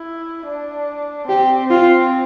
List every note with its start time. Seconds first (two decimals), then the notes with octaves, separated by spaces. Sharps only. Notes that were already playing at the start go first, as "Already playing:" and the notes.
Already playing: E4
0.47 D4
1.29 C4 G4
1.70 F4